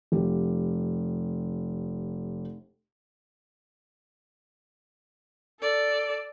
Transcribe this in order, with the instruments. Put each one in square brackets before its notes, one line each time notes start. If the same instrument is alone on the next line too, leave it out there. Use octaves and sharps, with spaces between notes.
[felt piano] F1 G4
[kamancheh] A4 D5